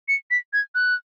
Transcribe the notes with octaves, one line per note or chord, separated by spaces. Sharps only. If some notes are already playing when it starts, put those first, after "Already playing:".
C#7
B6
G#6
F#6